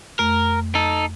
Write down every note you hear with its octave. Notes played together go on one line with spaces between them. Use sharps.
F2 A3 A#4
D#4 A4